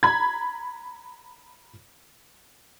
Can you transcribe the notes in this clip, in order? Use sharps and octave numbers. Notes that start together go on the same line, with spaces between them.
A#5 B5 G#6